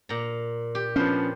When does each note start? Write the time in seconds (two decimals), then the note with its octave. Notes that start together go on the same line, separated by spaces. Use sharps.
0.09 A#2 A#5
0.75 G4
0.96 F3 B3 C#4 D4 C5